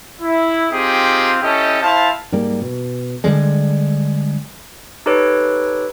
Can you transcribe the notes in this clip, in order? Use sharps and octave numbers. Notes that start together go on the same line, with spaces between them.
E4
C4 D#4 F4 G4 G#4
C#4 E4 G4 A4 D#5
E4 C5 F5 A5
G#2 G3 A#3
B2
D3 D#3 G3 G#3
D#4 G4 A4 B4 C#5 D7